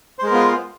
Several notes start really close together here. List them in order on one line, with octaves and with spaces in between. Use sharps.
C5 G#3 A#4 B3 F4